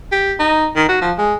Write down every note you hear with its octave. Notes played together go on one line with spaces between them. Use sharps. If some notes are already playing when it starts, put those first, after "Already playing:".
G4
D#4
D#3
F#4
F3
G#3